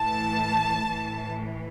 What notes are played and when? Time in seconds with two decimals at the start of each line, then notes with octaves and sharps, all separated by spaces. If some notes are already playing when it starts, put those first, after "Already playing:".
Already playing: A2 E3 A5
0.91 A2 E3